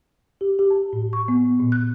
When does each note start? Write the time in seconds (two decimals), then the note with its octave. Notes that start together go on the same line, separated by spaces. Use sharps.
0.41 G4
0.59 G4
0.70 A5
0.93 A2
1.13 C#6
1.28 B3
1.60 A#2
1.72 F#6